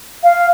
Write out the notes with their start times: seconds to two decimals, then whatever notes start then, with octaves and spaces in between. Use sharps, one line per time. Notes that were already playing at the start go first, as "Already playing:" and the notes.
0.24 F5